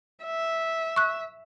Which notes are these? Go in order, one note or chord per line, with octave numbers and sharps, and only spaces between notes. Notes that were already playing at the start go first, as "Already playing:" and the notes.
E5
C#6 F#6